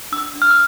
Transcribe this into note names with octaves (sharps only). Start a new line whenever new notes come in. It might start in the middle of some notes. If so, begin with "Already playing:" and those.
D4 E6
D4
F6
E6